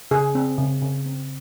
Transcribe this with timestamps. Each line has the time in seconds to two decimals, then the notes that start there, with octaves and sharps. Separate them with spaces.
0.11 C#3 G#4
0.35 C4
0.58 C#3
0.82 C#3
1.06 C4